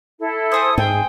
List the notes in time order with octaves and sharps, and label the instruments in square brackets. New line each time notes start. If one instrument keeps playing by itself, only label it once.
[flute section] E4 A4
[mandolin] C4 G#4 C5 [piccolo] D#6
[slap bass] G#2 [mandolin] G#4 [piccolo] G5